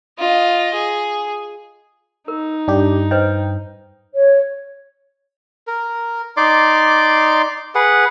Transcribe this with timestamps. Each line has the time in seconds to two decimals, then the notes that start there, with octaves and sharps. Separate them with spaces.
0.18 F4 D#5
0.74 G#4
2.28 D#4 A#4
2.68 G2 D4 G4
3.11 B4 C5 D#5 G5
4.14 C#5
5.67 A#4
6.37 D#4 D5 C6 D6
7.75 G#4 B4 F#5